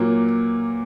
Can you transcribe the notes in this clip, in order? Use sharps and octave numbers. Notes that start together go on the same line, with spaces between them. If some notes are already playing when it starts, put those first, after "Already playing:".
Already playing: A#2 F#3 A#3